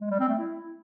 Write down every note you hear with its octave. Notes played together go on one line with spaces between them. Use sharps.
G#3
G3
C4
A3
E4